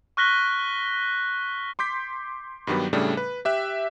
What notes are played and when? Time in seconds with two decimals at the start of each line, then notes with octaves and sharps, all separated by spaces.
0.17 C#6 F6 F#6 A#6 B6 G7
1.79 C6 D6 G6 B6
2.67 G2 D#3 F#3 G3 B3
2.93 A2 C#3 G3 A3 D4
3.17 B4
3.45 G4 E5 F#6